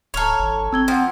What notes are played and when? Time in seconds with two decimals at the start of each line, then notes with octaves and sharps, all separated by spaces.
0.14 D1 A4 C#5 A#5 F6 F7
0.39 G#1
0.73 C4 E6 G#6 G7
0.88 F3 F#5 G5